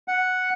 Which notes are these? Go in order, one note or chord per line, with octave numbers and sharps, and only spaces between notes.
F#5